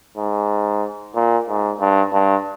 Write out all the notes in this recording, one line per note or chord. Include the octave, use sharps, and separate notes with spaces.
G#2
A#2
G#2
G2
G2